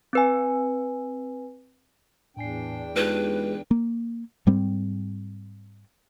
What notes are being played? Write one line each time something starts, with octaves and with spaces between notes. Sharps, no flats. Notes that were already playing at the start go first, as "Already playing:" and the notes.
C4 B4 G#5
E2 A2 D4 G5 G#5 C7
G#3 D#4 F4 G4 B4
A#3
G#2 G3 C4